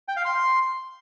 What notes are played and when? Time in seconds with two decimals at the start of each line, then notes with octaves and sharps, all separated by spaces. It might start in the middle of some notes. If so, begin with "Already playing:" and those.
0.08 G5
0.17 F5
0.25 C6